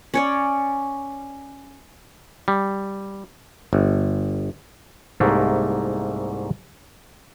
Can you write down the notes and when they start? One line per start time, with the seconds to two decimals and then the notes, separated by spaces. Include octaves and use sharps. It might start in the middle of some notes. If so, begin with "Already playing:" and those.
0.14 C#4 C#5 D5
2.48 G3
3.73 G1
5.20 C2 G#2 A3 A#3